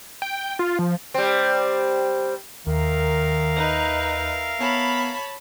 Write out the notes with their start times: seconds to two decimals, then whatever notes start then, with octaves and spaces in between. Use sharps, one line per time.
0.22 G5
0.59 F4
0.79 F3
1.14 G3 C4
2.67 D#2 D#3 A#4 E5 F5
3.56 D#4 B4
4.60 B3 C#5 A5 B5